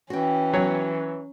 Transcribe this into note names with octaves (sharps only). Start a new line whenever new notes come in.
E3 C#4 F#4 G5
F#3 C#5